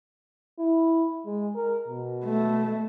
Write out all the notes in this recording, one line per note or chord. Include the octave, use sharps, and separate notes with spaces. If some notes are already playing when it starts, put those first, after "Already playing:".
E4
G#3
A#4
B2
A3